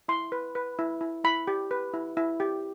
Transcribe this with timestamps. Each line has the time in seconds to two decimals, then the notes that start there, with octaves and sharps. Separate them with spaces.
0.08 E4 C6
0.32 B4
0.55 B4
0.79 E4
1.01 E4
1.24 E4 B5
1.47 G4
1.71 B4
1.94 E4
2.17 E4
2.40 G4